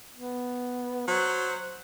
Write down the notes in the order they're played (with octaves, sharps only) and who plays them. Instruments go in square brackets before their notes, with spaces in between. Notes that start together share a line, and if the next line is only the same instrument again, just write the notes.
[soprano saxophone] B3
[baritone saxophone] F#3 [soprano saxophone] C5